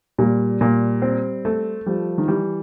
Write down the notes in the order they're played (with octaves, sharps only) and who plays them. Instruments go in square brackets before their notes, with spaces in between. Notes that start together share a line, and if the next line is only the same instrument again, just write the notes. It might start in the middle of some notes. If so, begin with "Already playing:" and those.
[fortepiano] A#2 [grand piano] G3
[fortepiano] A#2
C4
A3
[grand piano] F3 [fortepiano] G3
[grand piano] D#3
[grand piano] E3 [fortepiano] G3